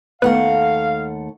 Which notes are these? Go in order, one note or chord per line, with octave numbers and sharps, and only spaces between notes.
D#2 A3 B3 F5 F#5